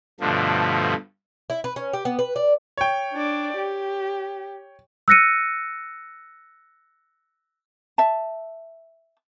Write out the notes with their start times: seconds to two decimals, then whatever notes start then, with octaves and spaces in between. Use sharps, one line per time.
0.20 G2 B2 D3 F3 A3
1.50 E4
1.64 B4
1.76 C#4
1.93 G4
2.05 B3
2.19 B4
2.36 D5
2.77 C#5 G5
3.13 D4 D5
3.57 G4
5.08 E6 F#6 A#6 C#7 D#7
7.98 E5 A5